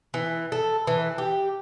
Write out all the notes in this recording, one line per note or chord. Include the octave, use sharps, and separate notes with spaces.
E3
A4
E3
G4